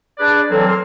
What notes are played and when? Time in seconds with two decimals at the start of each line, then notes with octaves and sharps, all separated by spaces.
0.19 D4 G#4 B4 D5
0.50 E3 F#3 A#3 C4 A4
0.68 A#4 C6 F6